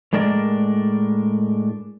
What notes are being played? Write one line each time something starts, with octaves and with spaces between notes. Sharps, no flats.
A2 G#3 D4 A#4 D5